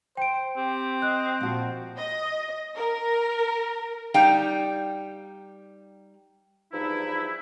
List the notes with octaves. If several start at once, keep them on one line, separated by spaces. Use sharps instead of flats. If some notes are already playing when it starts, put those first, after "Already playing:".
C5 G5 D7
C4 G4
D#5 F#6
A#2 F3 F#4
D#5
A#4
G3 D#4 F5 G5
E2 G2 F3 D#4 E4